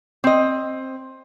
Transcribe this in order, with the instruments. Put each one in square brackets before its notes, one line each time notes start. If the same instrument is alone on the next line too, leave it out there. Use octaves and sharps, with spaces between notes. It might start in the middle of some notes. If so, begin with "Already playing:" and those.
[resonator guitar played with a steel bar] C4 D#5